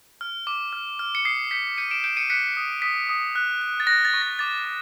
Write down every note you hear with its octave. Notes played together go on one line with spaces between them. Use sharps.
F6
D6
F6
F6
C#7
D#6 C7
G6 B6 C#7
G6 C#7 D#7
D7 E7
G6 D7 E7
C#7 D#7
F#6 B6 C#7
D#6
D#6 B6
D#6
F#6
F#6
A6
F#6 A#6
A6
C#6
A#6
D6 A6
D6